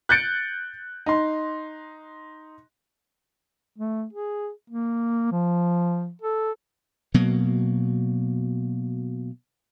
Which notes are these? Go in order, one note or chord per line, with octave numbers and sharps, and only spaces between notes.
F#6 G6 A6 C#7 D7
D#4 C6
A3
G#4
A#3
F3
A4
B2 F#3 A#3